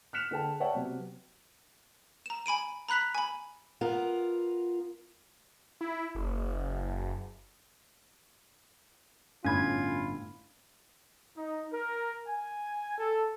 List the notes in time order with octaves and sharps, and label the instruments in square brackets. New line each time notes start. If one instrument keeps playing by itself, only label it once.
[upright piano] F6 F#6 B6 C#7 E7 F7
D3 G#4 G5 A5
C#5 D5 E5 F#5 G5 A5
C3 F#3 B3
[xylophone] A#5 E7
G#5 B5 D7 D#7
A#5 B5 F#6 B6 F7
G#5 B5
[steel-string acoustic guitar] B3 F4 A#4
[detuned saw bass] E4
F#1
[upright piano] G1 A2 B5 [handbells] C#4 G#6 [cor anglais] F4
[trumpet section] D#4
A#4
G#5
A4